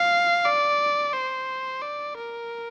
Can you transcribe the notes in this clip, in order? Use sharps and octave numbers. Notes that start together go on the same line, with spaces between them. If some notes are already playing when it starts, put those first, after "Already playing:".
Already playing: F5
D5
C5
D5
A#4